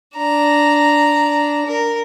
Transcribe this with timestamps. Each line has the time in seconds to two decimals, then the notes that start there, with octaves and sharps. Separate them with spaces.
0.17 D4 A#5
1.66 A#4